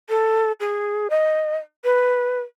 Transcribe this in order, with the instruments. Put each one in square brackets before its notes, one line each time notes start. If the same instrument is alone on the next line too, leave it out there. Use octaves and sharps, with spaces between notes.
[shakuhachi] A4
G#4
D#5
B4